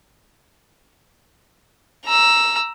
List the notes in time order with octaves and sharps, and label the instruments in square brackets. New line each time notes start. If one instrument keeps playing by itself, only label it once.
[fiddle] A#5 E6